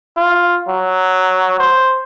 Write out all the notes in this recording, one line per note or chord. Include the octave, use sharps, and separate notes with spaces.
F4
F#3
C5